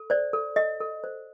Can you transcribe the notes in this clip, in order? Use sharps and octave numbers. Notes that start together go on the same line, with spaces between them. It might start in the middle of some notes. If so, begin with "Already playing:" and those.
Already playing: A4
C5 D5
A4
A4 D#5
A4
C5